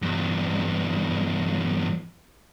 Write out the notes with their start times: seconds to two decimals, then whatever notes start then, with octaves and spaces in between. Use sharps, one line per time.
0.02 E2 G2